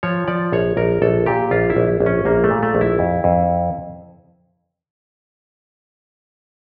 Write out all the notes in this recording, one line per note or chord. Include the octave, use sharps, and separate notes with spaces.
F3 C#5
F3 D5
A#1 C#5
A#1 A#4
A#1 A4
A#2 G4
A#1 F4
E4
A#1
A#1
C#4
A#1 A#3
A3
A#2
A3
A#1
E4
F2
F2